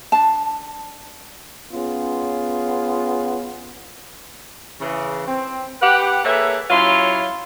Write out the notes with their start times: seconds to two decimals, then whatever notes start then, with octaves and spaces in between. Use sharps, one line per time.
0.12 D4 A5
1.72 B3 C#4 F4 G#4
4.81 C#3 E3
5.28 C4
5.82 G4 B4 F#5
6.25 A#3 G#4 A4 B4 C#5 E5
6.70 F#3 C#4 E4 F4 C#5 C6